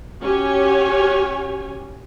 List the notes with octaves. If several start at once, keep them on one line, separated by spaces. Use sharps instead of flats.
C#4 F#4 G4 C#5 G#5